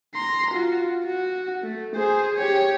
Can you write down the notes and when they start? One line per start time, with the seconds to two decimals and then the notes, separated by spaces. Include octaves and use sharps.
0.15 A#5 C6
0.51 F4 F#4
1.03 F#4
1.63 A3
1.95 G#4 C5
2.35 G4 C#5